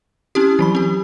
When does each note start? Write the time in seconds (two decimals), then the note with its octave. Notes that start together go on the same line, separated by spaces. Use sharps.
0.35 C4 C#4 E4 G4
0.59 E3 F#3 B5
0.75 C4 G4